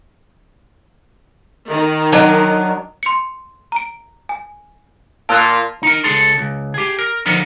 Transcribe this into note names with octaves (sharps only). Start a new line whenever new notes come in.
D#3
F#3 D4 D#5
C6 C#7
A#5 D7
G#5
A#2 F4 A5 E6 F#6
D#4 A#4
C#2 G#4 A4 C6
C#2
G4 G#4
A#4
D3 F3 B3 D#4 A#4